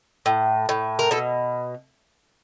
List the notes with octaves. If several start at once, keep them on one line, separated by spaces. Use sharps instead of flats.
A2
A2
A#4
B2 A4